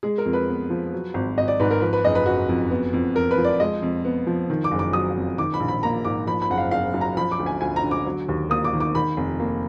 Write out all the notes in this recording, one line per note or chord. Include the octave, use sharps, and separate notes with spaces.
G#3 G#4
A#4
F2
B4
B3
F3
F#3
G#1
G#1 D#5
D5
G#2 B4
A#4
F3 B4
B4
F#1 D#5
B4
F#1 F#4
F2
B3
F2
F2 A#4
B4
F3
D5
G#3 D#5
F2
B3
F3
D#3
D6
F#1
D6
F#3 D#6
F2
D#3 D6
B5
A#1
B5
A#3 A#5
G#2 D6
F3 B5
B5
F#1 F#5
F5
F#1 F5
F#2
A#5
F3 B5
D6
D2
G#5
D2 G#5
A#5
D3
D6
F#3
D#2
A#3 D#6
D6
D#3
D6
D#3 B5
F1
A#3